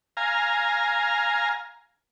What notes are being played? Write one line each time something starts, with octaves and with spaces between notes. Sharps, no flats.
F5 G#5 A#5